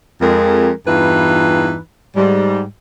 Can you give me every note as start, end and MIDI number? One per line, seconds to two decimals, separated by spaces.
0.21 0.71 41
0.21 0.71 56
0.21 0.71 70
0.87 1.77 40
0.87 1.77 43
0.87 1.77 52
0.87 1.77 63
0.87 1.77 65
0.87 1.77 71
2.16 2.64 44
2.16 2.64 55